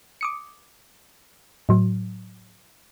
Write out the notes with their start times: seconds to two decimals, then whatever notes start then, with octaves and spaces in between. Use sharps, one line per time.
0.21 D6 D#6 C#7
1.69 A2 F#3